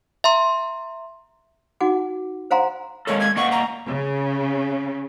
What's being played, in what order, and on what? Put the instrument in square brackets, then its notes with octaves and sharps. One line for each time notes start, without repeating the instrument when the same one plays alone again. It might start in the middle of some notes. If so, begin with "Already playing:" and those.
[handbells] E5 A#5 C6
[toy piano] D#4 F#4 F#5 G#5 D6
C5 F5 F#5 G#5 A#5 C6
[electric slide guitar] G#3 A#3 A4 [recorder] C#5
[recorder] G#6
[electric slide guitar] A#3 D#5 F#5 [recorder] C#6
[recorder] A#5
[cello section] C#3